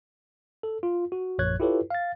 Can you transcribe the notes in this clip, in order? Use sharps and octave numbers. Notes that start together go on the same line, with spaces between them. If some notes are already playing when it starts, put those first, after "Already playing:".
A4
F4
F#4
A#1 F#2 C#5 F#6 G#6
E4 F4 G4 A4 B4 C#5
F5 A6